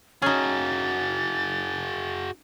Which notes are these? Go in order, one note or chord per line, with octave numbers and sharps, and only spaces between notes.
C#4 D#4 F#4 G#4 A6